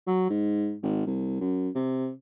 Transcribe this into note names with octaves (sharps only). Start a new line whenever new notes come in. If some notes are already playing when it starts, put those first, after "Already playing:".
F#3
G#2
G#1
C2
F#2
C3